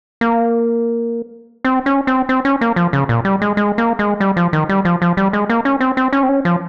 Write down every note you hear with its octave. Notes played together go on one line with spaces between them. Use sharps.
A#3
C4
C#4
C4
C4
C#4
A#3
F3
C#3
A#2
G3
G#3
G#3
A#3
G#3
G3
F3
D#3
G3
F3
F3
G3
G#3
A#3
C#4
C4
C4
C#4
C4
C#4
F3